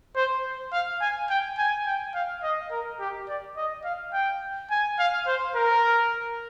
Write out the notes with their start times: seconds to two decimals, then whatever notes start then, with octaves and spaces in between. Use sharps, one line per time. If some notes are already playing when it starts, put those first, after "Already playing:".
0.16 C5
0.72 F5
1.01 G#5
1.29 G5
1.58 G#5
1.86 G5
2.14 F5
2.43 D#5
2.71 A#4
3.00 G4
3.28 D5
3.57 D#5
3.85 F5
4.13 G5
4.71 G#5
4.99 F5
5.27 C5
5.55 A#4